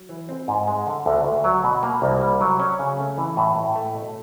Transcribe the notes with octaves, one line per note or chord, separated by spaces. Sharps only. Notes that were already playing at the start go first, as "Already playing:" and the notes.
Already playing: F#3
E3
C4
G#2
G#3
D3
D2
D2
F#3
B2
A#3
C2
G3
F#3
C#4
C#3
A3
E3
A2
A2
A3
B2